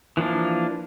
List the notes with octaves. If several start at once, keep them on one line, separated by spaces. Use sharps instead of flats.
E3 F3 A#3 D4